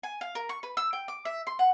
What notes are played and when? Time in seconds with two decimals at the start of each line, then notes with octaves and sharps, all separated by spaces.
0.03 G#5
0.21 F5
0.35 A#4
0.49 C#6
0.63 B4
0.77 E6
0.93 G5
1.08 D6
1.25 E5
1.47 C6
1.59 F#5